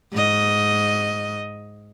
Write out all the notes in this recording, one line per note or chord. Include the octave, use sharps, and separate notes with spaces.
G#2 D#5